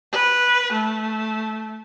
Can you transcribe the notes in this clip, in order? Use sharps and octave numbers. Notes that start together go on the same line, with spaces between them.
B4
A3